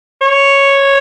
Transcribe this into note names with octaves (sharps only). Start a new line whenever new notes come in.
C#5